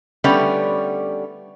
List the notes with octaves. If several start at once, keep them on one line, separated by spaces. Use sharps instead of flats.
D3 G3 A3 B3 C#4 D4